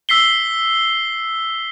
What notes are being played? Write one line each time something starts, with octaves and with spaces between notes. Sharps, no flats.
E6 B6 C7 G7